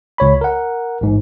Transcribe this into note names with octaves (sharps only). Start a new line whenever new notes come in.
C#2 C#5 B5
A#4 F#5
A1 G#2